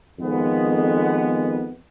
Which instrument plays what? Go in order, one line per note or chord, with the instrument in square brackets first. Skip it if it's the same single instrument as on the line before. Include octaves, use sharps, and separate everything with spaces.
[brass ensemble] F2 D#3 G#3 B3